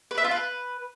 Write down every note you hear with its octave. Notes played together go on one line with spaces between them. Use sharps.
B4
E5
F4
B4